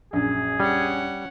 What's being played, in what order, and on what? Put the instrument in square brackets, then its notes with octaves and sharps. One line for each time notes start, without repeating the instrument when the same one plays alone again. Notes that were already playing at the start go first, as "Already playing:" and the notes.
[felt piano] A#1 F#2 [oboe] G#4
[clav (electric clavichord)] G3 [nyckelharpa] C#4 F#5